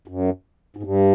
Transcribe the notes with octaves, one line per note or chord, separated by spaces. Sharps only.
F#2
G#2
G2